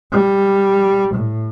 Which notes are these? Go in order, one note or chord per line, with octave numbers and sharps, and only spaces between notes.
G3
A2